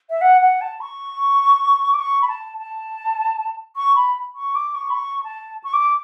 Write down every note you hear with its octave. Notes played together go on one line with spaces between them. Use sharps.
E5
F#5
F#5
A5
C#6
D6
C#6
B5
A5
A5
C#6
B5
C#6
D6
C#6
B5
C#6
A5
C#6
D6